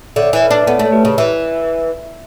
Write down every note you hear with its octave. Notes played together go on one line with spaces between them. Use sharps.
D3 C#5 E5
E3
B4 D5
D4
D5
B3 A4 C#5
A3
C#5
G4 B4
C#3
E3